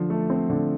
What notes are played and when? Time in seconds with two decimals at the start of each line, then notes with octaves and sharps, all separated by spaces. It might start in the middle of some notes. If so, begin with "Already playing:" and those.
Already playing: D3 F3
0.10 A3
0.30 C4
0.50 D3